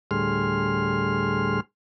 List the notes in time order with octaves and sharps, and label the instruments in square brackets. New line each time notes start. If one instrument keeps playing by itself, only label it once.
[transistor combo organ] D2 A2 G3 G#4 C6 F6